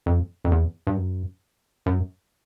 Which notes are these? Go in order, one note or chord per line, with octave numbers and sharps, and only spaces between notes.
F2
F2
E2
G2
F#2
F#2